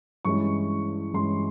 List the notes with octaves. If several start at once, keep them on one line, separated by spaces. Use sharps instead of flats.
G2 E3 G#3 C#4 E4 C#6
G2 E3 G#3 C#4 E4 C6